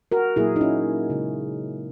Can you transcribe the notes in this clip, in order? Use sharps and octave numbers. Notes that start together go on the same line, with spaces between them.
F#4 A#4
A#2 F#3 A#3 E4 G#4
D#4
C#4 E4
C#3 G#3